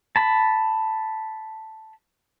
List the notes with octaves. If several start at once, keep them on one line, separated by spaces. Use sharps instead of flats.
A5 B5